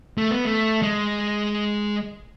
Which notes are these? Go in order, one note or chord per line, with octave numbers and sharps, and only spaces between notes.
A3
B3
A3
G#3